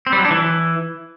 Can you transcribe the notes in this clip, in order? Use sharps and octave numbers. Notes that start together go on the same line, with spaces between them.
C4
G3
F#3
D4
E3